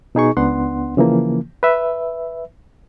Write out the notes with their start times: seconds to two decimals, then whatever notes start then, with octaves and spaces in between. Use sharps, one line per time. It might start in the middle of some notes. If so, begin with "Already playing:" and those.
0.15 B2 D#4 G#4 C#6
0.37 C#2 B3 D4 F#5 C6
0.97 C#3 E3 F3 A#3
1.63 B4 E5